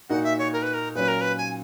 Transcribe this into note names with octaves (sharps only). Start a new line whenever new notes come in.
A#2 A#3 D#4 F#4 F#5
E5
C#5
A#4
B4
A#4
A#2 F#3 C#4 B4
A#4
B4
G#5